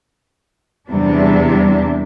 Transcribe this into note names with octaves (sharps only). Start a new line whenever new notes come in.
E2 C3 G3 D4